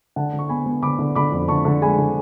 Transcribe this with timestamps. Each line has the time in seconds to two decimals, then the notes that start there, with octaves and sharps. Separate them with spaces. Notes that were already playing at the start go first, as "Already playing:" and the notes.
0.16 D3 F#5 A5
0.33 D3
0.39 C#6
0.49 B3 G#5 B5
0.66 B3
0.82 D3 B5 D6
0.99 D3
1.15 D3 B5 D6
1.32 F2
1.48 D3 A5 C#6
1.65 D3
1.82 G#3 G#5 B5
1.99 D3